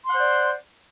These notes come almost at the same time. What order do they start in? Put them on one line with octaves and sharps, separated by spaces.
C6 F#5 C5 D5